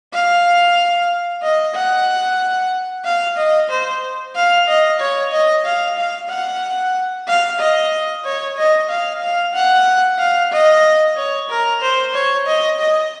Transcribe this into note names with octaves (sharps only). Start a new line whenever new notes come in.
F5
D#5
F#5
F5
D#5
C5
F5
D#5
C#5
D#5
F5
F5
F#5
F5
D#5
C#5
D#5
F5
F5
F#5
F5
D#5
C#5
A#4
C5
C#5
D#5
D#5